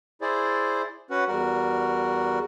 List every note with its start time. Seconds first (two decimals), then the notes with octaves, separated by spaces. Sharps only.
0.22 E4 G#4 C5 D5
1.11 C#4 F#4 B4 F#5
1.28 E2 G3 F#4 A#4